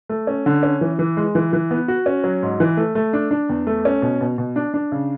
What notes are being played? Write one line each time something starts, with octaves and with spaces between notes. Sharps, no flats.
A3
C#4
D3
C#4
E3
E3
G#3
E3
E3
B3
F#4
C#4
F#3
G#2
E3
A3
A3
D4
D4
E2
A3
C#4
B2
B2
B2
D4
D4
C#3